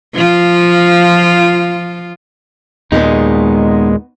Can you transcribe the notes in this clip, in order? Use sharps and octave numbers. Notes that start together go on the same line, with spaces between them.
F3 F4
D#2 A#2 G#3 B3 D#4